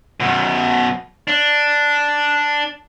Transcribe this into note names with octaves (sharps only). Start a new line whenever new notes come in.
F#2 B2
D4